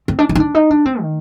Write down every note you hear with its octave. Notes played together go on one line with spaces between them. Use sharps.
C4
D4
D4
D#4
D4
D#4
D4
C4
D#3